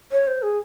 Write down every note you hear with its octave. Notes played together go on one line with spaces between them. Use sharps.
C#5
C5
G#4